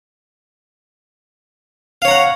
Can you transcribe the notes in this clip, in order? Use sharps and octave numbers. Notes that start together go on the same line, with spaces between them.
C#5 F5 F#5 A#5